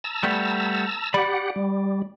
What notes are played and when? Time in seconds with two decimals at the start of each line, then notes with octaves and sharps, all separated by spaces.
0.04 A5 A#5 E6
0.23 G3 A3 B3
1.14 G4 D5 F#5 B5
1.56 G3